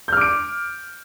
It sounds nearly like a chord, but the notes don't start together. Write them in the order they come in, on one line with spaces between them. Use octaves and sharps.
G6 F6 D6 D7